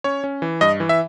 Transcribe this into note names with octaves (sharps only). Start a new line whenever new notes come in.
C#4 C#5
C#4
E3
G2 D#5
E3
E5